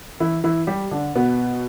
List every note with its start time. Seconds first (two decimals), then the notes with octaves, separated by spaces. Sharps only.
0.20 E3 E4
0.44 E3 E4
0.67 G3 G4
0.91 D3 D4
1.15 B2 B3